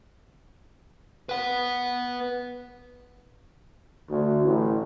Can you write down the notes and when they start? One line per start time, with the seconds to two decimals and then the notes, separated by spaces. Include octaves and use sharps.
1.29 B4 F#5
4.09 D2
4.44 A1